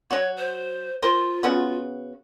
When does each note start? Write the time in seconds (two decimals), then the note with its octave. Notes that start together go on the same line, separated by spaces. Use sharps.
0.11 F#3 F#4 C#5
0.37 C5
1.02 F4 A#4 C5
1.43 C#3 B3 F#4